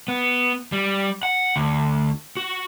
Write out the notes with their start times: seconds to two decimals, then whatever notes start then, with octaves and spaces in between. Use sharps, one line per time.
0.08 B3
0.72 G3
1.23 F#5
1.56 D2
2.37 F#4